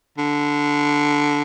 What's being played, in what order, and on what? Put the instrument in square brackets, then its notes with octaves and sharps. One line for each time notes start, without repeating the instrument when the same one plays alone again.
[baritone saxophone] D3